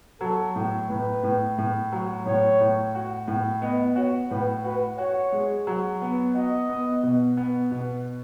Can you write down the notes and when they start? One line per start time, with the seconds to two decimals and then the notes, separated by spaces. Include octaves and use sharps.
0.21 F#3 A4
0.56 A2
0.90 A2 B4
1.23 A2
1.58 A2
1.92 F#3
2.26 A2 C#5
2.60 A2
2.95 F#4
3.28 A2
3.62 B3 D#5
3.96 F#4 C#5
4.31 A2 B4
4.64 F#4 B4
4.98 F#4 C#5
5.32 G#3
5.67 F#3
6.02 B3
6.35 F#4 D#5
6.69 B3
7.03 B2
7.37 B3
7.71 B2